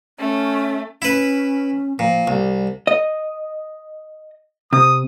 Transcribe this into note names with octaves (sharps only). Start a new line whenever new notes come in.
A3 C#4
C#4 E4 B4
A#2 F3
C2 G3
D#5
C3 D#6